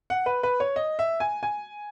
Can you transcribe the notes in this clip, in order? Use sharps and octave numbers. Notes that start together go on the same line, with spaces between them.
F#5
B4
B4
C#5
D#5
E5
G#5
G#5